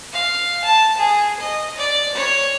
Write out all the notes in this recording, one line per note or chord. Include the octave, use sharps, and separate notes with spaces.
F5
A5
G#4
D#5
D5
C#5